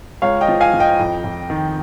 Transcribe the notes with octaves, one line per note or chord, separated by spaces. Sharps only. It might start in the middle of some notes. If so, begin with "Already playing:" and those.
C#2 C#5 F5
D#5 G5
F3
F5 G#5
F3
D#5 G5
F2
F2
D#3